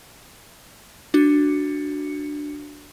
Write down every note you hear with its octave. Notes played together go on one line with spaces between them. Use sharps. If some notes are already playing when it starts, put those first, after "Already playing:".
D4 F#4 C#7